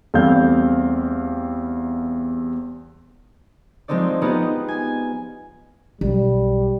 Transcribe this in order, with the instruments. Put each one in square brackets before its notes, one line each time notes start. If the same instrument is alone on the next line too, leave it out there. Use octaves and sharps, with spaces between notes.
[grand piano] E2 G3 A3 C4 F5 G6
[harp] F3 G#3 A3 C4 D#4 D5
B3 D#4 F4 G4 G#4 B4
G#5
[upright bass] B1 [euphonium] G3